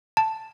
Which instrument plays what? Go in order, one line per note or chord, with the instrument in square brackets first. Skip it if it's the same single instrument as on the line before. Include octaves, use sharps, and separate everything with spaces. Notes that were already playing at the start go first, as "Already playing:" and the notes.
[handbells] A5